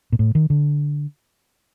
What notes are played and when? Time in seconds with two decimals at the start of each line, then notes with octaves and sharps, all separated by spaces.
0.12 A#2
0.19 A2
0.35 D#3
0.50 D3